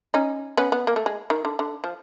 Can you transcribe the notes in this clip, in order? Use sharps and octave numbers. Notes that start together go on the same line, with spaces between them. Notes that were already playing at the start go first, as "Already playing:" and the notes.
C#4 D#4
B3 C#4
B3
A#3
A3
G#3
D#3
D3
D3
F3